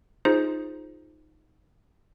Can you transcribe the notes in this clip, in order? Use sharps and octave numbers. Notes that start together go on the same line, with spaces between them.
D#4 F4 G#4 C5